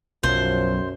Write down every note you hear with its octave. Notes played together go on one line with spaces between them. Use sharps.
B1 F#2 F3 F#3 C5